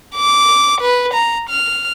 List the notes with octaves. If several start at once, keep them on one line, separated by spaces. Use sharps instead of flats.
D6
B4
A#5
F6